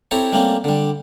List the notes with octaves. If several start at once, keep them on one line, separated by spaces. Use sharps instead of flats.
C4 E4 G4 A4 C#5 A#5
G3 A3 A#3 C4 C#4
D3 G3